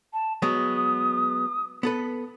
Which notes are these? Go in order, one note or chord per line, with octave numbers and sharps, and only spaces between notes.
A5
F#3 G#3 B3 D#6
B3 A4 B4